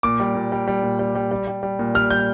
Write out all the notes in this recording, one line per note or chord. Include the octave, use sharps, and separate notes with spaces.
A#2 D6
G3
A#2
G3
G3
A#2
G3
G3
G3
G3
G3
A#2
G3 F6
G3 G6